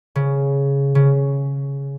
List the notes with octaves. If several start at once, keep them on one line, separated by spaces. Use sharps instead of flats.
C#3
C#3